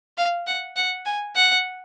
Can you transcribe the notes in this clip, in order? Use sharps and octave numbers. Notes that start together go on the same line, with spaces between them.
F5
F#5
F#5
G#5
F#5